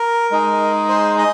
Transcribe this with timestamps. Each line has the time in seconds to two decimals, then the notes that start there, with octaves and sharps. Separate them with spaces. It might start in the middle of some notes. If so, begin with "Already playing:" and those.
Already playing: A#4
0.31 G#3 D#4 G#4
0.89 C5
1.18 D#5